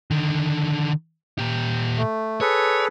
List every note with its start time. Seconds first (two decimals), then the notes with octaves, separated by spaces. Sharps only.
0.11 D3 D#3
1.39 A#2 G4
1.97 A3
2.41 G#4 A4 B4 C#5